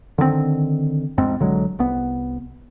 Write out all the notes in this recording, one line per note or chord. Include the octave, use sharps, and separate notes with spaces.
D3 D#3 G3 C4
E1 F2 G#2 C4
B1 D3 F#3 G#3
C2 B3